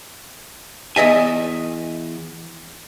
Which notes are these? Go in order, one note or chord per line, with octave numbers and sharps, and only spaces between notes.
E2 D#5 E5 G#5